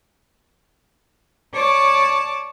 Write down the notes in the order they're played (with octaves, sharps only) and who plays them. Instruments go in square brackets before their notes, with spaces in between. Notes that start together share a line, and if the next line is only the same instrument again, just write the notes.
[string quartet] C#5 D5 A5 D6